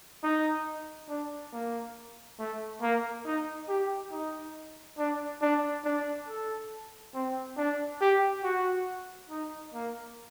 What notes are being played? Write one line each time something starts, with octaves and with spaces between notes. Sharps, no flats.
D#4
D4
A#3
A3
A#3
D#4
G4
D#4
D4
D4
D4
A4
C4
D4
G4
F#4
D#4
A#3